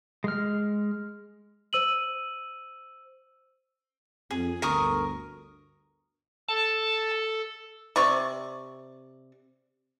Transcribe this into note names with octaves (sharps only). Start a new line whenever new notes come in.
G#3 F6
C5 E6 D#7 F#7
F2 G#4
G1 D2 A#4 C#6 D#6
A4 A5
C3 D5 C#6